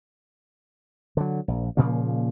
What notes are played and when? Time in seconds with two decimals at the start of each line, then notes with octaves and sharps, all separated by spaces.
1.17 D3 F#3
1.48 A#1
1.77 A#2 C#3 F3 A#3